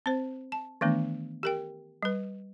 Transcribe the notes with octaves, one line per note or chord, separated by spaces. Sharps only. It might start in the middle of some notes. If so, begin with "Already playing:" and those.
C4 C5
A5
D#3 E3 A3 B3 D4
G4 A#4 G5
G3 B4